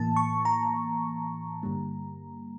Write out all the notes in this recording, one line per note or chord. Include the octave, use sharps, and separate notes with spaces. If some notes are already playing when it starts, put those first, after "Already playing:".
Already playing: A2 E3 A#3 A5
C#6
A#5
G2 D3 G3 A#3